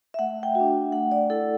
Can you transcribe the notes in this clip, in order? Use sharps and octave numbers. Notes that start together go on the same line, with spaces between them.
E5
A3 F#5
G5
D4 F#4
A3 F#5
D5
E4 A4